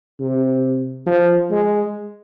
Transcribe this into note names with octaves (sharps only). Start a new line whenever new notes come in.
C3
F3
G#3